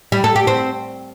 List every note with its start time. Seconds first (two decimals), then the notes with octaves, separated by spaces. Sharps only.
0.12 G3
0.24 A4
0.36 G4
0.47 C4